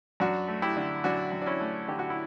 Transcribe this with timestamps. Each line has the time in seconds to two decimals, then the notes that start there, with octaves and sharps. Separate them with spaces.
0.20 F#2 D4 F#4
0.48 A3
0.62 E4 G4
0.77 D3
1.04 F#2 D4 F#4
1.32 F#2
1.42 D4
1.46 C#4 E4
1.60 A3
1.88 D3 G4
1.99 F#4
2.10 E4